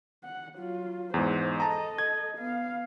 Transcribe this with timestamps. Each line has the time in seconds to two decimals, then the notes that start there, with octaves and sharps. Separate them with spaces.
0.24 F#5
0.55 F#3 F4
1.14 E2 G#2 C5
1.60 A4 D#5 A5 A#5
1.98 G#6
2.37 B3 F5